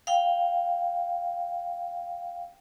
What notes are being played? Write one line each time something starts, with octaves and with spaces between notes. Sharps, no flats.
F5 G5